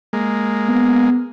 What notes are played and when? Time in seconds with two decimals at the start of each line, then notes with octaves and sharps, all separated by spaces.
0.13 G#3 A#3
0.69 B3